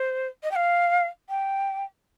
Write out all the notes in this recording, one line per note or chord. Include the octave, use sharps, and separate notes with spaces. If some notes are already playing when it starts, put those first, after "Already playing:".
Already playing: C5
D#5
G5
F5
G5